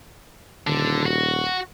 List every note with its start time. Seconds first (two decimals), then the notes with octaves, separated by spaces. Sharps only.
0.67 D#1 D3
1.06 F#4